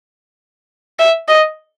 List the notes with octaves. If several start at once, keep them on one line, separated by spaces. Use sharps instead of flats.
E5
D#5